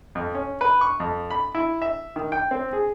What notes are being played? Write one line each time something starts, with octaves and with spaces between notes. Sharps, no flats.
F2
C#4
B4
C#6
F2
B5
E4
E5
D#3
G5
C4
G#4